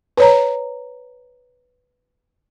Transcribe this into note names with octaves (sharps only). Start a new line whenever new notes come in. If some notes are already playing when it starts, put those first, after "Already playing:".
B4 C#5 A#5